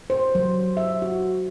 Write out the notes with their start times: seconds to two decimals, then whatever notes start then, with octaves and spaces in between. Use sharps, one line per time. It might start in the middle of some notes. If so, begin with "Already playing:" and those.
0.10 C5
0.35 F#3
0.77 E5
1.02 F#4